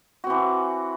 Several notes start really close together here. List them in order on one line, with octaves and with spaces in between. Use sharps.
F#4 C4 E3